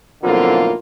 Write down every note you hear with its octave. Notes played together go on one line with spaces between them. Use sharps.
B1 F2 A2 D3 A#3 F4